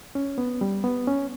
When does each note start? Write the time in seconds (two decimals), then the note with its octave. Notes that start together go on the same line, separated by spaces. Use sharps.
0.15 C#4
0.38 B3
0.61 G3
0.84 B3
1.08 C#4